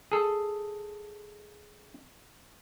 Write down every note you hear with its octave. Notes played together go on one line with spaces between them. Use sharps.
G#4 A4